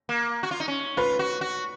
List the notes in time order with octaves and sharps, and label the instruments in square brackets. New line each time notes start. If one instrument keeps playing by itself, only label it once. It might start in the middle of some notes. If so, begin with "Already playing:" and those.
[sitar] A#3
F#4
F4
D#4
C#4
[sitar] F4 [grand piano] B4
[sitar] F#4
F#4